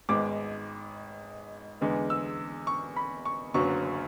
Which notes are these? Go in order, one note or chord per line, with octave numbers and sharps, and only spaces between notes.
G#1 G#2 G#3 B3 D6
E2 D3 G#3 B3
E6
C#6
B5
C#6
F#1 F#2 D3 F#3 B3 C#6